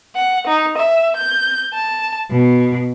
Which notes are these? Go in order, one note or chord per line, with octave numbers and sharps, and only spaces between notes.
F#5
D#4
E5
G6
A5
B2